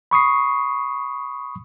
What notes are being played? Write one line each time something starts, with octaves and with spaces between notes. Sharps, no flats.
B5 C#6 D#6 C7